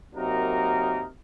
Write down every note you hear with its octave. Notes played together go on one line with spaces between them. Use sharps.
C3 F#3 A#3 D#4 A#4